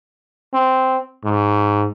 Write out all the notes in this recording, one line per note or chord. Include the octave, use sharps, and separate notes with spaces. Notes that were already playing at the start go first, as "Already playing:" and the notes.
C4
G#2